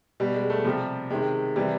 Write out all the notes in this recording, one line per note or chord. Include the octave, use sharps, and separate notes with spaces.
B2 G3
G#3
A3
C3 F3 G3
C3 D#3 G#3
C3 E3 G3